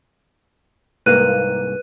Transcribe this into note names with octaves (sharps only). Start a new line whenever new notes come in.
C2 G#2 A#3 B4 F#6 D#7